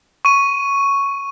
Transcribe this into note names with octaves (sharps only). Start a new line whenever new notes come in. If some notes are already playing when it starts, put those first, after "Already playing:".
C#6 D#7